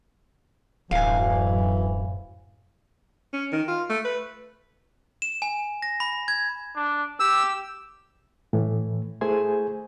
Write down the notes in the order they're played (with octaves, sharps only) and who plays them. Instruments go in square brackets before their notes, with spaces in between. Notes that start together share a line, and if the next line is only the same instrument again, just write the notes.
[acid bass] D1 [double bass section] F#2 A2 F#3 [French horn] E3 [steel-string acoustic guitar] F5 G#5
[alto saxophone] C#4
D#3
F4
A3
B4
[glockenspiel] E7
G#5
A#6
B5
G#6
[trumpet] D4
[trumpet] G4 [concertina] E6
[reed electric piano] A2 E3
A3 E4 G#4 C5 G#5